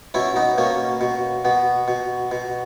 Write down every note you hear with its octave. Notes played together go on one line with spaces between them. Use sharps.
B2 C#4 E4
B3 D#4
B2 A#3 C#4
B2
B2 B3
B2
B2